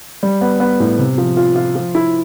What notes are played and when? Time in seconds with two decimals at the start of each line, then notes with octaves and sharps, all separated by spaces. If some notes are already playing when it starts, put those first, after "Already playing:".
0.23 G3
0.41 B3
0.60 B3
0.80 A2
0.99 C3
1.18 F3
1.37 F4
1.56 F4
1.75 F3
1.95 E4